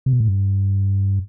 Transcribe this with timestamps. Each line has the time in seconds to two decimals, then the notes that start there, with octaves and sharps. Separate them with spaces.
0.06 C3
0.13 B2
0.20 A2
0.28 G2